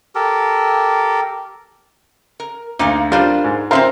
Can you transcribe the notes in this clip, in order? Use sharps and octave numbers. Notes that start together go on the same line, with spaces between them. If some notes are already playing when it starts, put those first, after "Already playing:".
G4 A4 A#4
A#4
D2 A#3 D#4 F5
G3 D4 F4 A#4 C5 D5
G#2
C4 C#4 F4 A#4 C5 E5